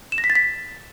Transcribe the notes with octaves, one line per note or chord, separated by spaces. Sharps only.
E7
A#6
B6
A6
B6